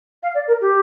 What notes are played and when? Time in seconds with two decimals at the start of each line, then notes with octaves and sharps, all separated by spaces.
0.22 F5
0.34 D5
0.47 A#4
0.61 G4